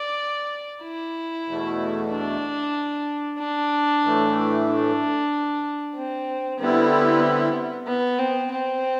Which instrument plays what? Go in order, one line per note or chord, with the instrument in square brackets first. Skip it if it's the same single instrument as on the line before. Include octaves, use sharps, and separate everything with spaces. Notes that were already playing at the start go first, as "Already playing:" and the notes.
Already playing: [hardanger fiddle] D5
E4
[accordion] E2 B2 A3
[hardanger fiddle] D4
D4
[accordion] A2 E3 A3
[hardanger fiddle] D4
C4
[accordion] D3 G3 C4 E4 [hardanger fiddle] B3
[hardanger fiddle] B3
C4
C4